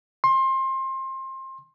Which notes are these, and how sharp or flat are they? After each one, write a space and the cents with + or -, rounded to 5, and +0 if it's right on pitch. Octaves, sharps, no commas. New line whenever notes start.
C6 +25